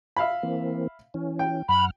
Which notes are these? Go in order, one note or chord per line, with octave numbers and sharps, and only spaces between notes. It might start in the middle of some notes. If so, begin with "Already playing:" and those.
E5 F5 B5
E3 A#3 C4
E3 C#4
G5
F#2 F#5 B5 F6